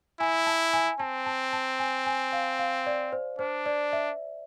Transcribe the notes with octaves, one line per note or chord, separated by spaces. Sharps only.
E4 G#5
A5
G#5
C4 A5
A5
A5
G#5
G#5
F5
F5
D5
C5
D4 C5
D5
E5